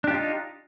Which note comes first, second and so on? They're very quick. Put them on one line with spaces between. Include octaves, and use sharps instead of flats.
D4 G4 F4 D#4